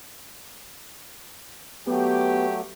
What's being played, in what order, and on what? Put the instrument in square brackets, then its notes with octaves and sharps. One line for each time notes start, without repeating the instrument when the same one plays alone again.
[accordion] F#3 A3 [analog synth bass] B3 [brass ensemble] G4